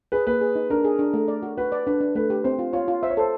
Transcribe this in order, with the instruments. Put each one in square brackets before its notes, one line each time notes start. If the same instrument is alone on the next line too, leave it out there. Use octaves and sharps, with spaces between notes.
[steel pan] G#4 [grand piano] B4
[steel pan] A#3 [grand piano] B4
[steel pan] G#4
D#4
[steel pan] D4 [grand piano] A#4
[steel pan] G#4
D4
A3
D5
F#4
[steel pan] F#4 [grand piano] B4
[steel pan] D5
[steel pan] D4 [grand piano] B4
[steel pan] D4
[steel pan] A3 [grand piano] B4
[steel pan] G4
[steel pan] C4 [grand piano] C5
[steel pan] F4
[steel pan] F4 [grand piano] C#5
[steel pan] F4
[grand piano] C5 [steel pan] E5
[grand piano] C#5
[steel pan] A4 [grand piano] C5